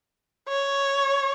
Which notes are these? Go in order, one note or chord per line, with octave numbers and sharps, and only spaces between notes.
C#5